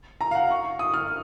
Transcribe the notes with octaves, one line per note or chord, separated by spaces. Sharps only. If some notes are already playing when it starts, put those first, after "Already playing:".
A#5
F5
F#5
C#6
D#6
F6